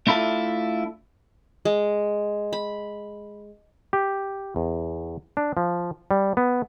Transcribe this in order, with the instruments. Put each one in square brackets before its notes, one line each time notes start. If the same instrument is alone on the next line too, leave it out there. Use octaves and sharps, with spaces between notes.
[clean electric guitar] A3 D4 E4 F4 A4
[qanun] G#3
B5
[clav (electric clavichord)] G4
E2
D4
F3
G3
B3